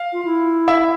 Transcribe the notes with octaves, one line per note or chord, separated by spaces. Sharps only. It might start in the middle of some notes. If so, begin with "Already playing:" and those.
Already playing: F5
F4
E4
E5